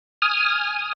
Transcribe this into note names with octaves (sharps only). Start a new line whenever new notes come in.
G#5 D#6 F6